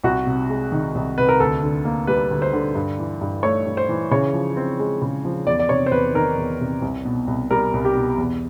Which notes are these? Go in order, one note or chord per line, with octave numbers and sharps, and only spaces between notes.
C2 F#4
C3
G#3
D#3
C2
C3 B4
A#4
D2 A4
D3
A#3
G3 B4
D2
C5
D3
G2
E3
G2
A3 C#5
G2
C5
E3
C#3 C#5
F3
C4
G#3
C#3
F3
E2 D5
D5
C3 C#5
C5
E2 B4
D#3 A#4
E2
C3
C2
B2
C2
G3 A#4
C2
G4
B2
E2